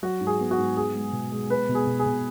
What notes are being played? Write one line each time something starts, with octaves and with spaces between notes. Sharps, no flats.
F#3 F#4
G#2
G#4
B3
F#4
G#2
B3 G#4
G#3
B2
G#3
B3 B4
B2
G#4
B2
G#4
B2